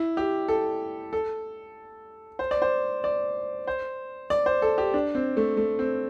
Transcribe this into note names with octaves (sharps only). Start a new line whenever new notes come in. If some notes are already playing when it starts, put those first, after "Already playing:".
Already playing: E4
G4
A4
A4
C5
D5
C5
D5
C5
D5
C5
A4
G4
D4
C4
A3
A3
C4